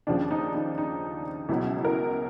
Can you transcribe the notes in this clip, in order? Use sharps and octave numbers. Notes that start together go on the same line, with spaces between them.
D#2 C#3 F3 D4
D#4
D#4
D#4
C#2 B2 F#3 E4
A#4